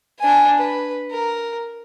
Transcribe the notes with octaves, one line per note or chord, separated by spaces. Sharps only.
D4 G#5
B4
A#4